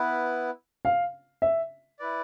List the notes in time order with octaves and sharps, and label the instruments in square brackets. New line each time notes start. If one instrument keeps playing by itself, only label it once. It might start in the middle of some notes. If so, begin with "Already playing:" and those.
Already playing: [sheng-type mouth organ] B3 E4 B4
[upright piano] F5
E5
[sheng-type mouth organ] E4 B4 D5